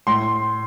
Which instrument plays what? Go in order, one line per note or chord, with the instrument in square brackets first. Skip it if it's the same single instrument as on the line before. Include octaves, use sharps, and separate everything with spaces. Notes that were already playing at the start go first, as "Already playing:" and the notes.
[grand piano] A2 C6